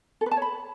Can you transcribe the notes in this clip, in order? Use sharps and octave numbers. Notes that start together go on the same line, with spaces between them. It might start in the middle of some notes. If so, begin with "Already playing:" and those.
A4
B4
A5
C#5
B5